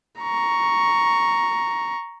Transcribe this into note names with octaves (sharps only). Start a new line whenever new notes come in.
A#5 C#6